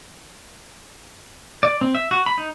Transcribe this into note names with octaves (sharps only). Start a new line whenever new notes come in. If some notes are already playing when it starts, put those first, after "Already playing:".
D5
C4
E5
F#4
B5
D#4